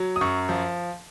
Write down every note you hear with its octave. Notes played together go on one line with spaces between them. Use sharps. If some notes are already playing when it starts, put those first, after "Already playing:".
Already playing: F#3
D#6
F#2 C#6
F3